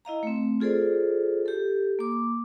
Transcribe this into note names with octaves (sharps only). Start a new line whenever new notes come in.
E4 D#5 F5 A#5
A3 C4
F4 G#4 A4 C5 D5
G4 A4
A#3 D6